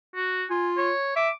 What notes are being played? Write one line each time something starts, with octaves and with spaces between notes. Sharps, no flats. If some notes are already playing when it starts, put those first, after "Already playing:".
F#4
F4 G#5
C#5
E5 D6